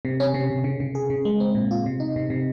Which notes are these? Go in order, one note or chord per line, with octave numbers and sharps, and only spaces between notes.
C3
C#4
C3
C3
C#3
C#3
G#4
C#3
G#3
C4
A#2
F4
C3
D#4
C3
C3